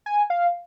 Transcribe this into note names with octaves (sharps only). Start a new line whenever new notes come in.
G#5
F5